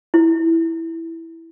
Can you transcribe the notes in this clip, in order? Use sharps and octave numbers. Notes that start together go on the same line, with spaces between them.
E4